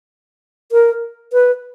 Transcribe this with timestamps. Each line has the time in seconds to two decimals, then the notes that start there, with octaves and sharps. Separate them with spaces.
0.72 A#4
1.33 B4